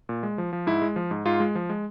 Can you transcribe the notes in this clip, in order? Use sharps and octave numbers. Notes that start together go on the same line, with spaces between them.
A#2
G#3
F3
F3
G#2 E4
G#3
F3
G#2
G#2 F4
G#3
F3
G#3